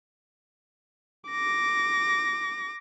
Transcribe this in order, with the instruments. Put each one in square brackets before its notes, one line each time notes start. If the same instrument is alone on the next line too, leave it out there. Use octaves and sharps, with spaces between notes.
[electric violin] D6 A#6